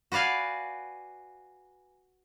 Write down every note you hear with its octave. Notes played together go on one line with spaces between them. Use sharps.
F#4 B4 D5 F5 G#5